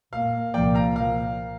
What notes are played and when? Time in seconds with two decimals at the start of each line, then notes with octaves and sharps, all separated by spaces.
0.13 A#2 A#3 F5
0.54 C2 A#2 F3 A#3 D5 G5
0.74 F5 A#5
0.96 A#2 F3 A#3 F5